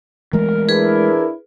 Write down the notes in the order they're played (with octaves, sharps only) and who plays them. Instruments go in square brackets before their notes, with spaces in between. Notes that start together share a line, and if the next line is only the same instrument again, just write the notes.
[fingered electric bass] E3 G#3 A3 [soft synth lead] A#4
[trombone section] D4 E4 [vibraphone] G#4 B4